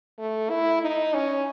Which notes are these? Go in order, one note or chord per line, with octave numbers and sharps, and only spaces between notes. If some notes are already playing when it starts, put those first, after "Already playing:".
A3
E4
D#4
C#4